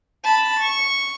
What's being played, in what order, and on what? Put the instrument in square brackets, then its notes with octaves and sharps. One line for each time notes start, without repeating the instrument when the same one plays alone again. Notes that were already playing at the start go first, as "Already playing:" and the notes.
[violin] A5 B5
C#6